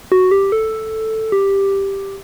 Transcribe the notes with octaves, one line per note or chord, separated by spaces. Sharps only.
F#4
G4
A4
G4